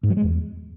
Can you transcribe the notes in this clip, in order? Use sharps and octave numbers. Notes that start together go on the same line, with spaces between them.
G#2
F#3
G#3
E2